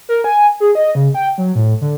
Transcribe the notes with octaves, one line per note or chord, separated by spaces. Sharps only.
A#4
G#5
G#4
D#5
C#3
G5
F#3
A2
D3